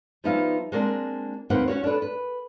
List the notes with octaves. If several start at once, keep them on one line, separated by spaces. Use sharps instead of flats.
F3 G3 B3 D#4 E5 F5
G#3 A#3 C4 D4
D#2 A#3 C4 D#4 B4 F#5
C#4 F#4 C#5
D4 A4 B4
B4